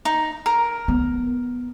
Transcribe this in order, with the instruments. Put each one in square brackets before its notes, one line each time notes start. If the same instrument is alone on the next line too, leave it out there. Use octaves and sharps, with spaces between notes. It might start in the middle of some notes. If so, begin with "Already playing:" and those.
[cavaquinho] D#4
A#4
[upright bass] B3